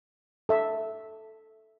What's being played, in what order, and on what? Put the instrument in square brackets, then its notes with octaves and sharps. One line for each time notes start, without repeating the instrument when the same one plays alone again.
[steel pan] A4 E5